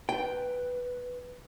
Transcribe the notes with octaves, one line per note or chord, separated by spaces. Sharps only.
B4 G5